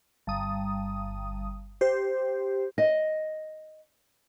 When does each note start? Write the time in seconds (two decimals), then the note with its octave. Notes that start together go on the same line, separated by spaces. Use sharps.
0.27 G1 D#6
1.81 G4 C5
2.78 D#5